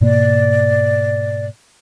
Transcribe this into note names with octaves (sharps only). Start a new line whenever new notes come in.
G#2 B2 A#3 D5